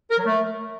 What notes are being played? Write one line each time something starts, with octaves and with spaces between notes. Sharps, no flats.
A#4
F#3
A3